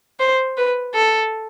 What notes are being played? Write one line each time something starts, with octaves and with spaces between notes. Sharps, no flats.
C5
B4
A4